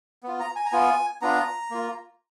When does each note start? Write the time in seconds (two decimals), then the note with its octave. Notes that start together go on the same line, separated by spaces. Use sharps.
0.23 B3 F4
0.40 A#5
0.56 G#5
0.66 A#5
0.72 B3 F4 G#5
1.22 B3 D4 F4 A#5
1.71 A#3 F4